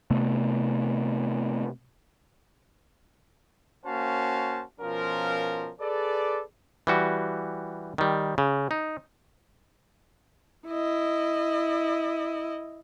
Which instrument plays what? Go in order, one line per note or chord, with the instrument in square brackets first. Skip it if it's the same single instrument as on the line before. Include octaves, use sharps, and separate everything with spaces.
[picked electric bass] C3 A3 B3
[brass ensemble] A#3 C#4 F#4 C5 F5 A5
B2 F3 C#4 F4 A#4
G#4 A4 B4 D5
[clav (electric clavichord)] E3 G3 F#4
D#3 G3
C#3
D#4
[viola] E4 D#5